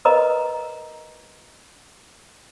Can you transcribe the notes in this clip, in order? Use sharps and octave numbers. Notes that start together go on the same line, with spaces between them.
A#4 B4 D#5 A#5